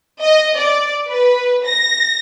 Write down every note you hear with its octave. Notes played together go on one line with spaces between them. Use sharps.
D#5
D5
B4
A#6